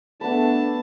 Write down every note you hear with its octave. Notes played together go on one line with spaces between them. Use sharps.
A3 B3 D4 A5 B5